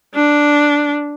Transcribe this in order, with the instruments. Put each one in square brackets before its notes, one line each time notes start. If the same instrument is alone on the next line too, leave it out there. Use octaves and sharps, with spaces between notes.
[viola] D4